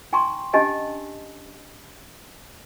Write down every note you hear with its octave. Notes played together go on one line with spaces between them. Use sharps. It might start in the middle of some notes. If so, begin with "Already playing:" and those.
D#4 G5 G#5 A#5 C6 C#6
C#4 D4 G4 D#5 G#5 A5